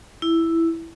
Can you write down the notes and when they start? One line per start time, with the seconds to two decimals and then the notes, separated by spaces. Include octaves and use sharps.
0.22 E4